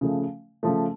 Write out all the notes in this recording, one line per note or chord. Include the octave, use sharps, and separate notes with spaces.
C#3 F3 A3
C#3 F3 A3